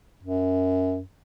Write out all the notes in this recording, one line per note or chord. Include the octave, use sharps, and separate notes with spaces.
F#2